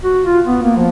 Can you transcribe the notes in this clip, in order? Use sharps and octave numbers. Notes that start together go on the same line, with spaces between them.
F#4
F4
B3
A#3
F3